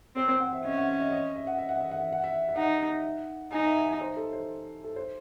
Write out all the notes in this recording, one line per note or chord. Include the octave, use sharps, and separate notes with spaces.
C4 C5
C5
F#5
E5
C#4 D#5
E5
F#5
E5
D#5
C#5
D#5
E5
F#5
E5
F#5
E5
F#5
E5
F#5
E5
E5
D#4 F#5
D#4 G#5
E5
G#5
G#5
C5
A4
C5
A4
C5